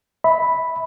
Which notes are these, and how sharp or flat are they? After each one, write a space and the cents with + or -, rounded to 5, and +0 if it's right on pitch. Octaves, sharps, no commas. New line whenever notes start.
E5 -30 B5 +0